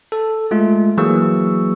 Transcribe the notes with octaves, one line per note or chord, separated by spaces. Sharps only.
A4
G#3 A3 F4
E3 F#3 A#3 G#4 C#6 E6